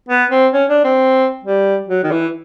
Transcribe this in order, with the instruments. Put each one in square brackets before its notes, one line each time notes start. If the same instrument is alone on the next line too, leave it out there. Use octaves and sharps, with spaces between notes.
[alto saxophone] B3
C4
C#4
D4
C4
G3
F#3
D#3
E3